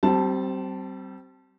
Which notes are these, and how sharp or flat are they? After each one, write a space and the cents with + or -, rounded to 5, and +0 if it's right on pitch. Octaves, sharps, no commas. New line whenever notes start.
G3 -30 C4 +0 A5 +0